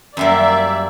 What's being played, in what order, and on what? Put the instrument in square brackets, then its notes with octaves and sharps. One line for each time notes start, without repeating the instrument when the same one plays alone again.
[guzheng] F#2 G3 A#3 [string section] D5 E5